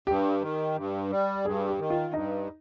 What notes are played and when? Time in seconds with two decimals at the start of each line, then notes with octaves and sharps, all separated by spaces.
0.07 G2 G4
0.41 D#3
0.76 G2
1.10 G3
1.45 G2 G#4
1.68 G4
1.79 D#3
1.90 F4
2.13 G2 D#4